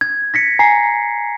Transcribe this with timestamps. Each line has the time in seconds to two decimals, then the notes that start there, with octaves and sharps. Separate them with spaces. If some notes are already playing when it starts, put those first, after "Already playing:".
0.01 G#6
0.34 A#6 B6 C#7
0.59 G#5 A#5 C7